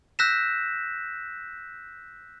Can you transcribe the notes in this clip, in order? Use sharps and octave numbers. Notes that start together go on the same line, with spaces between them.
E6 F#6 G6 A#6 B6 E7